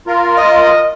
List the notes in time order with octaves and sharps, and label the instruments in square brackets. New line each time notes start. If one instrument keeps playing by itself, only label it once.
[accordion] F4 A#4
[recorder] D#5